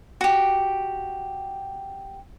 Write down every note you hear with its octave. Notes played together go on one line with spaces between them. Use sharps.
F#4 G4